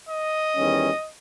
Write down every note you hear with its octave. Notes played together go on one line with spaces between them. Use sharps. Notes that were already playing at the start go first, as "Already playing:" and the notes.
D#5
E2 D#3 G3 C#4